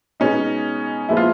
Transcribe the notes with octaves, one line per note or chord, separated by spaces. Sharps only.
B2 G#3 B3 C#4 D#4
A#2 F3 G#3 B3 E4
F4